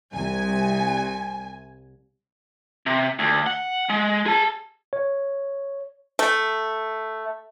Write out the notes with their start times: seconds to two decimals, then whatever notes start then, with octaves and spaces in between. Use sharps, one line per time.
0.11 C2 G#5
2.86 C3
3.19 D2
3.46 F#5
3.89 G#3
4.26 G#4 A5
4.93 C#5
6.19 A3